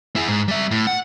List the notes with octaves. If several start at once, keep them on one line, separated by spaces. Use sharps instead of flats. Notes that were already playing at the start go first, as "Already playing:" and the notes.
E4 G#4
G#2
G3 E5
A2
F#5